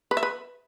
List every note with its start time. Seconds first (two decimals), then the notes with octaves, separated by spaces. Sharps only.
0.11 B4
0.17 E5
0.23 B4